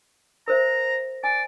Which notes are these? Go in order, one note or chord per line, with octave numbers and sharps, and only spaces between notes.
A#4 C5 E5 A#5
D5 G#5